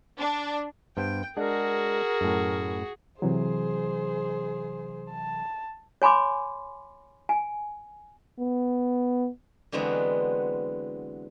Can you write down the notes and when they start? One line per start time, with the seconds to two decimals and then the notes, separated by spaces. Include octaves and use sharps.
0.19 D4
0.97 G2 B3 C5 G5
1.37 G#3 D4 F#4 G#4 A#4 F#5
2.21 F#2 A2
3.22 C3 E3 F#3 G#4 C5
5.11 A5
6.02 C#5 G#5 B5 C6 D6
7.29 G#5
8.39 B3
9.72 D3 E3 F#3 G#3 B3 C4